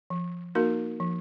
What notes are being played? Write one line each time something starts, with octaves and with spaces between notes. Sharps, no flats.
F3
A#3 D#4 F#4 A#4
F3